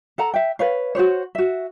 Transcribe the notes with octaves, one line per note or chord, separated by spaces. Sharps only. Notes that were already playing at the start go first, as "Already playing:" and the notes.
A4 F#5 A#5
E5 G5
B4 C#5 F5
F#4 G#4 C5 C#5
F#4 E5